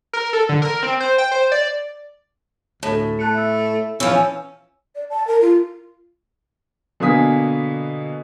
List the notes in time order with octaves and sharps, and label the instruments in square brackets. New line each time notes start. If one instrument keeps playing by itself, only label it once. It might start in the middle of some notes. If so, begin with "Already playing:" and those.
[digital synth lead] A#4
A4
D3
A#4
C4
C5
G5
C5
D5
[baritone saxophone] D2 [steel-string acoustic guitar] A2 [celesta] A4 A5
[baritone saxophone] A3 [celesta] A5 F#6 C#7
[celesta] E5 E6
[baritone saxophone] E3 [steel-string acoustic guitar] F3 C#4 [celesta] E6
[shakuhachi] D5
A5
A#4
F4
[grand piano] B2 D3 A#3 G#5 D#6 B6